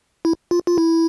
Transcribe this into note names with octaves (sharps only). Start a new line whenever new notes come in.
E4
F4
F4
E4